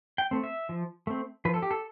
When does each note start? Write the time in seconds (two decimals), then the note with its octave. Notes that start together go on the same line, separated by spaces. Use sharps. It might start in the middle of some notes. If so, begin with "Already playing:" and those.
0.18 G5
0.31 A3 C4
0.44 E5
0.69 F3
1.07 A3 C4
1.45 F3 B4
1.54 A4
1.62 G4
1.71 A4